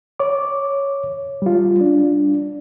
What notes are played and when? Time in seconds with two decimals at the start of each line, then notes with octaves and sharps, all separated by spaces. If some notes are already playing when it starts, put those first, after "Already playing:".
0.20 C#5 D6
1.42 G3 F4
1.81 D4